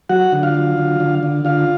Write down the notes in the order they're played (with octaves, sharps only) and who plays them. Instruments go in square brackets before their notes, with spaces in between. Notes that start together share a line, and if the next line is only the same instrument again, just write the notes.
[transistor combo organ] F#3 F#4 F#5
D3
F4 F5
F#3
D3
D3
D3
D3 F4 F5